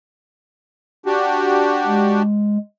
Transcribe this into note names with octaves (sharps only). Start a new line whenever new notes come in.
D4 F#4 G4
G#3